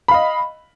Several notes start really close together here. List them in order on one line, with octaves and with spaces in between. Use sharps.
B5 F5 D#5